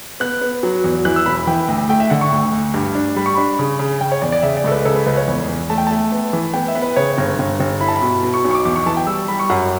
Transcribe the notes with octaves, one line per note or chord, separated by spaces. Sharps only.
B3 F#6
B3
F#3
E2
E3 F#6
E6
E1 B5
B5
E3 G5
D2
A3 G5
E5
D3 F#5
C#6
D2
D2
G2
D4
G3 B5
C#6
D4 B5
C#3
C#3
C#3 G5
C#5
E2 D5
D5
C#3 E5
D5
C#2 A4
B4
C#3 A4
B4
C#2 B4
C#5
E2
E2
A3 A5
G5
A3 A5
B3
E3
B3 G5
E5
B3
B4
C#3 C#5
G1
G1
G1
E4 B5
A5
B5
B2
B2
C#6
B1
C#6
D6
E2 D6
C#6
E3 A5
G5
G3 E6
G3 B5
C#6
F#2 F#5